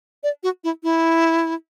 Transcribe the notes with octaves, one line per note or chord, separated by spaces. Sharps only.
D5
F#4
E4
E4